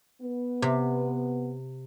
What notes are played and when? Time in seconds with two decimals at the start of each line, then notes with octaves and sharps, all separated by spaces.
0.21 B3
0.62 C3